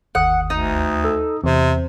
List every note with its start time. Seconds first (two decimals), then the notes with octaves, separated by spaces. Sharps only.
0.15 G1 D#2 F#5 D#6
0.50 D2 D#4
1.04 A4 E6
1.44 E2 C3 C4 C5